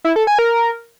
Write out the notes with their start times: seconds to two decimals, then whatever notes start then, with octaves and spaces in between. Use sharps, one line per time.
0.04 E4
0.16 A4
0.27 G#5
0.39 A#4